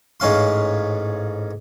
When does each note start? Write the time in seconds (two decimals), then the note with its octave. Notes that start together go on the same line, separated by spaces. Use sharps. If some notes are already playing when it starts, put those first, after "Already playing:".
0.20 A1 G#2 C#4 F5 C6